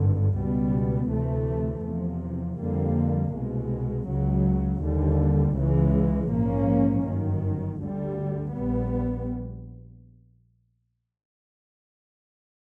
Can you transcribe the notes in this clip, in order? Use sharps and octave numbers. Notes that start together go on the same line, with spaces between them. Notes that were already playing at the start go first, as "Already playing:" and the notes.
Already playing: G#1 G2 D3
C#2 B2 G3 B3
D2 C3 E3 A3
E2 C3 F3
F2 D3 G3 A#3
C2 B2 G#3
C#2 C#3 F#3
D#2 D3 G3
C#2 C#3 E3 G#3
A#1 G#2 F3 A#3 C#4
G1 F#2 D#3
D2 D3 G3
A#1 A#2 G3 B3